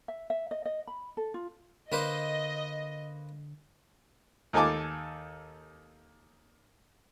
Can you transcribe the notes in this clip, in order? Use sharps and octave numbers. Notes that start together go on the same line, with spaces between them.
E5
E5
D#5
D#5
B5
A4
F4
D3 A#3 B4 C5 D#5
D#2 D#4 A4 G#5 A5 D6